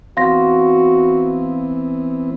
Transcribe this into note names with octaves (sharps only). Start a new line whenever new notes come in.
E3 B3 C4 F#4 F5 C6 A#6